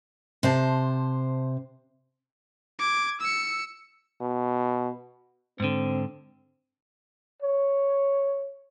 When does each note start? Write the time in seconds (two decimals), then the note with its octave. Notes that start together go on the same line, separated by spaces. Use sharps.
0.43 C3 C5 A5
2.79 D6 G#6
3.20 E6 C#7
4.21 B2
5.60 G#2 D3 C4
7.42 C#5